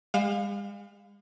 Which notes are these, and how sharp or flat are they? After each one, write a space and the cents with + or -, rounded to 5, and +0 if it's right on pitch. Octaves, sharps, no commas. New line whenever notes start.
G#3 -45 F5 +20